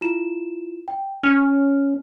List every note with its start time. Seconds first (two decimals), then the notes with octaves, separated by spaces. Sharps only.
0.01 E4 F4 E7
0.88 G5
1.23 C#4 F6